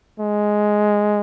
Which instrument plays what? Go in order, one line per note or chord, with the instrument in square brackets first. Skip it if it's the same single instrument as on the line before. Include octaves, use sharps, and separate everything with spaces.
[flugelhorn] G#3